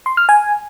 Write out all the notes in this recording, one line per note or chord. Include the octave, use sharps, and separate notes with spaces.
C6
F6
G#5